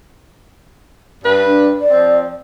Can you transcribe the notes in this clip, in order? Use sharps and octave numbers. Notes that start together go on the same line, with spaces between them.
G2 G3 B4
D4
D5
F3 C4